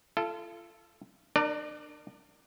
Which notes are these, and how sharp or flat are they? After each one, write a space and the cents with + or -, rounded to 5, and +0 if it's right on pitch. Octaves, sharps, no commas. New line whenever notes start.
F4 -35 A4 +0
D4 +40 A#4 +0 D5 +0